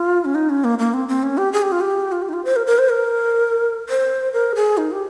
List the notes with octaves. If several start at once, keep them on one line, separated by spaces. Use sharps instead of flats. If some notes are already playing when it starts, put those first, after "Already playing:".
Already playing: F4
C#4
D#4
C#4
A#3
A#3
C4
C4
C#4
G4
G#4
G4
F4
G4
F4
G4
D#4
F4
C5
A#4
A#4
C5
A#4
C5
A#4
G#4
D#4
G4